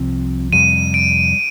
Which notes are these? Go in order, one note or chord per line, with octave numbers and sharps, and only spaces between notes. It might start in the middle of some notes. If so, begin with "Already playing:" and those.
Already playing: C2 C3 F3 C4
F2 C3 G3 D#7
D7